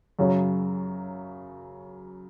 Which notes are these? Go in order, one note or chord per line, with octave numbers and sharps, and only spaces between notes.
F#2 C#3 F#3